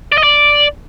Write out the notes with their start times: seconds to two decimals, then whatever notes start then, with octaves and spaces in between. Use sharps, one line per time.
0.12 D5
0.18 D#5
0.23 D5